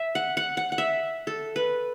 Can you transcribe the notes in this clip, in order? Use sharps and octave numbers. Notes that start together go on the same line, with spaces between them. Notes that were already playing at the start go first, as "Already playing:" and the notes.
Already playing: E5
F#5
F#5
F#5
F#5
E5
A4
B4